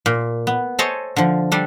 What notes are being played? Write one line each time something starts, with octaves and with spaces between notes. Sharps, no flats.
A#2
B3
A4 C5 C#5 D#5 G#5 A5
D3 F3
G3 D4 A4